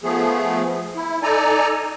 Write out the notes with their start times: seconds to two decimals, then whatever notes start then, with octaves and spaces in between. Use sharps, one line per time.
0.03 F3 A3 B3 G#4
0.96 E4
1.23 D#4 A4 D5 G#5 A#5